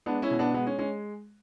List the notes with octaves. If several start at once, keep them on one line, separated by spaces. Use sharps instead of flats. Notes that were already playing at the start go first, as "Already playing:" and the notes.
G#3 B3 D4
C#4 E4
B2
B3 D4
G#3 B3
C#4
G#3 C#4